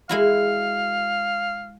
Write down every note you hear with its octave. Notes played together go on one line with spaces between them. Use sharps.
G#3 E4 F#4 F5